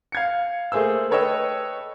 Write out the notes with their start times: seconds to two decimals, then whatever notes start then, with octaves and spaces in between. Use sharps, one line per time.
0.12 F5 G#6 C#7
0.72 A3 A#3 G#4 C5 E6
1.11 A4 B4 C#5 D#5 G5 E6